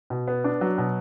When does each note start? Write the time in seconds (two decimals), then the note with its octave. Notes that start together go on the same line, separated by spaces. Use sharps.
0.10 B2
0.28 B3
0.44 D4
0.61 F#3
0.78 B2